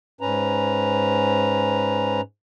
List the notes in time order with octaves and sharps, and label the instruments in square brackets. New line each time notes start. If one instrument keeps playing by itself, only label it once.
[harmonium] G#2 C#4 B4 A#5